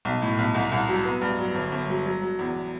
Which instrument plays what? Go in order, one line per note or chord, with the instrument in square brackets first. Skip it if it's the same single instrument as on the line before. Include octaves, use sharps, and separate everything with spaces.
[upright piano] B1
A2
B1
C2
C2
F#3
B3
G2
F#3
G1
G1
F#3
F#3
F#3
E2